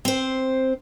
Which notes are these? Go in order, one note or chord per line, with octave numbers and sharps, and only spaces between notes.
C4 C5